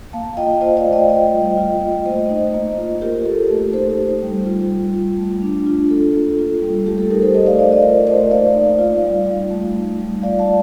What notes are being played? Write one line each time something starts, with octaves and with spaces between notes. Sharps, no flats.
A#3 F5 A5
F4 D#5 G5
F4 C5 D#5
D5 F5
A3
D#5 G5
F4 D#5 G5
G3
F4
A#3
A3 C5 D#5
D#4
A#3
F4
F4 G4 A#4
A#3 A4
A3 G4
D#4 A4 C5
D#4
G3
F4
G3
F4
A3
D4
F4
F4 A4
A#3
F4
G3
A3 G4
A4
D#4 G4 A#4
A4 C5
A3 C5 D#5
D5 F5
D#4 D5 F5
D#5
F4 A#4 D5
A3 C5 D#5
A#3 D5 F5
D#4
F4
G3
F4
A3
D#4
G3
F4 D5 F5
F5 A5
A3